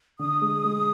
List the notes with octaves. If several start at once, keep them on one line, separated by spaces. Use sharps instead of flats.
D3 D#6
G#3
G#3